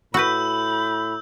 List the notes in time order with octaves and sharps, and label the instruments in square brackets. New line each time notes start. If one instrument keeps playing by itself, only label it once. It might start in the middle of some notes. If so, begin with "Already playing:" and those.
[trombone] A2 [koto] F#4 B4 [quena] B5 [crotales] E6 G6